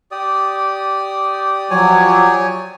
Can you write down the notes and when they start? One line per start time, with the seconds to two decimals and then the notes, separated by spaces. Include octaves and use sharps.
0.11 G4 D5 D#6
1.71 F3 F#3 C#5 G#5